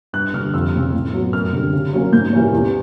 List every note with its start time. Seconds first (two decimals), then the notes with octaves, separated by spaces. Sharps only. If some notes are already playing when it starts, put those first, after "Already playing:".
0.13 G2 F#6
0.34 D3 G3 F6
0.54 F2 E6
0.74 C#3 E3 A3 C4
0.94 A2
1.14 F#3 B3
1.33 F#2 F6
1.53 D3 G3 C4
1.73 C#3
1.93 F#3 A#3 C#4
2.13 G#2 G6
2.33 E3 G3 A#3 C#4
2.53 E2